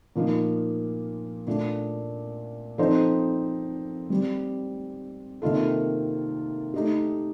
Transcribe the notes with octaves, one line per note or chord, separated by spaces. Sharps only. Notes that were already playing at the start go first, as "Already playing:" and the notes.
A#2 F3 A#3 D#4 A#4
A#2 A3 D4
F3 C4 D#4 A4 C5
G3 C4 G4
C3 D#3 A#3 F4 A4
A3 D#4 G4